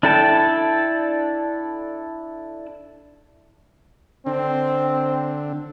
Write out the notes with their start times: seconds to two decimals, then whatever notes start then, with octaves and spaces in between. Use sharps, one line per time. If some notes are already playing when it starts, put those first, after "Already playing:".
0.03 D4 E4 A4 G5 A5
4.26 D3 C4 D4